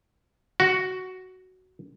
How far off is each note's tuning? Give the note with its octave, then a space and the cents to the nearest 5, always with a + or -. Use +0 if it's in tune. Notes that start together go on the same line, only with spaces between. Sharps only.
F#4 +5